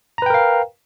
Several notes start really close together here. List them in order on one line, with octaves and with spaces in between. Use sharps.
A#5 B4 G5 A#4 F5